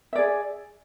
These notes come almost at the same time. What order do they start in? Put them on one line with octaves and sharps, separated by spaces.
E5 D5 G#4